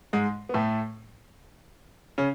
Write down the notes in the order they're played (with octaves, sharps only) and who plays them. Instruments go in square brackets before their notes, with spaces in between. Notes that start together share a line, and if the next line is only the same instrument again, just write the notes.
[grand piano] G#2 G#3
B3
A2 A3
C#3 C#4